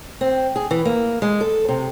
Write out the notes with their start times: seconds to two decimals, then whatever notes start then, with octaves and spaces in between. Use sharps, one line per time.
0.21 C4
0.56 G#4
0.71 E3
0.85 A#3
1.22 G#3
1.41 A4
1.69 C3